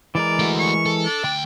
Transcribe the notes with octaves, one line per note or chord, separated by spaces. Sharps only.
E3 G#3 A#4 D5
A3 F#4
C#6
A4
D4
D2 G5